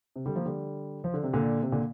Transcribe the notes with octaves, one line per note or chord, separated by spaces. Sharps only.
C3
D3 G3
F3 A#3
D3 G3
F3
D3
C3
A#2 D3
C3
A#2 D3